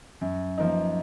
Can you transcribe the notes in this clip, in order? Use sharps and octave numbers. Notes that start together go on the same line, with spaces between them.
F#2
F3 A#3 D#4